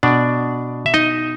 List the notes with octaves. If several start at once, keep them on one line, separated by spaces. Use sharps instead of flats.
B2 D4 D5
E5
D#4 D#5